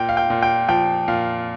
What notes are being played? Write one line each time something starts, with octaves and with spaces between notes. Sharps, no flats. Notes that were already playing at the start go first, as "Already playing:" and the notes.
Already playing: A#2 G5
F5
G5
A#2
G5
F3 G5
A#2 F5